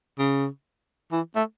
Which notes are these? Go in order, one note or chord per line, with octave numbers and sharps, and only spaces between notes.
C#3
E3
A3